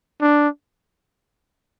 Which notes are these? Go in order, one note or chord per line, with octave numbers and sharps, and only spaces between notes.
D4